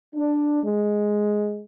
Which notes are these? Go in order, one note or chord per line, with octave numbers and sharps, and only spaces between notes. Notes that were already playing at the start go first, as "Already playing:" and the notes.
D4
G#3